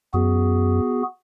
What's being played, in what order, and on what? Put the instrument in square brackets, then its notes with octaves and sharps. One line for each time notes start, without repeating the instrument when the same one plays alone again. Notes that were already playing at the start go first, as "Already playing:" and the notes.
[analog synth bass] F#2 [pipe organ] B3 F#4 G#4